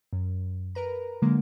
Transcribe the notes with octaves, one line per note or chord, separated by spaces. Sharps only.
F#2
A#4 B4 A#5
D3 F#3 G#3 A#3